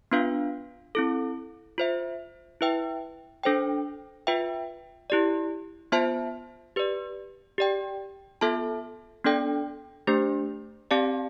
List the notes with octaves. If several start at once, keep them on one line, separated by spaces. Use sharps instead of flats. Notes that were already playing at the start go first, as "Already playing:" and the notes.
B3 D4 F4 B4 F5
C4 E4 A4
F4 C5 E5
E4 B4 E5 G5
D4 A4 C5 G5
F4 B4 E5 G5
E4 G4 D5
B3 F4 C5 E5 A5
G4 B4 D5
G4 D5 G5
B3 F4 A4 E5 A5
B3 D4 A4 D5 G5
A3 D4 G4 C5
C4 G4 D5 F5 A5